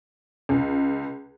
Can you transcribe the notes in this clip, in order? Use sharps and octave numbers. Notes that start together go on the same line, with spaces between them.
C#2